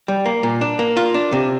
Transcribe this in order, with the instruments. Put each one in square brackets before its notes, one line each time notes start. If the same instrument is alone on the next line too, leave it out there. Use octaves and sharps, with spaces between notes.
[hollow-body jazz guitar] G3
A#3
A#2
D4
A#3
F4
D4
C3